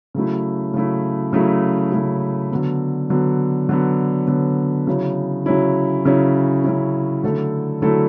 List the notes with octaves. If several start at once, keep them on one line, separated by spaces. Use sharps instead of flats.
C#3 F#3 A3 E4
C#3 F#3 A3 E4
C#3 F#3 A3 E4
C#3 F#3 A3 E4
D3 F#3 B3
D3 F#3 B3
D3 F#3 B3
D3 F#3 B3
C#3 F#3 C#4 E4
C#3 F#3 C#4 E4
C#3 F#3 C#4 E4
C#3 F#3 C#4 E4
D3 F#3 A3 E4 A4
D3 F#3 A3 E4 A4